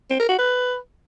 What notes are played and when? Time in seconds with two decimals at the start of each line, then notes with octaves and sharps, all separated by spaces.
0.10 C4
0.20 A#4
0.29 F#4
0.39 B4